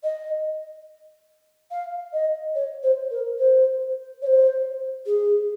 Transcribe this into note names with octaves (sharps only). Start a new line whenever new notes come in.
D#5
F5
D#5
C#5
C5
A#4
C5
C#5
C5
G#4